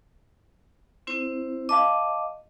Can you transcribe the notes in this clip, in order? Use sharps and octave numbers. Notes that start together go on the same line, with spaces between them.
C4 E4 C5
D#5 F5 A5 D6